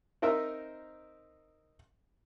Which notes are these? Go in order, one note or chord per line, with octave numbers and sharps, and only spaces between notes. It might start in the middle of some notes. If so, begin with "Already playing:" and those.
C4 D#4 A#4 C5 E5